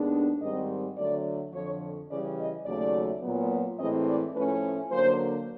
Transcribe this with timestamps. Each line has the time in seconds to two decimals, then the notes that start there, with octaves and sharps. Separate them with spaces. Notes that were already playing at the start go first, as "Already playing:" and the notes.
Already playing: D#2 D#3 G#3 B3 D4
0.42 G#2 D#3 G3 C4 D#5
0.98 D3 F#3 A3 D5
1.53 F2 D3 F3 C#5
2.10 C#3 E3 G3 D5
2.39 D#5
2.66 D#2 C#3 F#3 A3 D5
3.22 A#2 F#3 B3
3.78 A2 E3 G#3 C4 D#5
4.07 D5
4.34 A2 F3 A3 C#4 B4
4.91 D3 F#3 A#3 C5